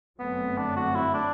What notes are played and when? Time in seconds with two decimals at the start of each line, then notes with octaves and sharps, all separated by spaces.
0.20 G1 F#2 F#3 A3 B3 C4
0.58 D4
0.76 F#4
0.95 E4
1.14 D4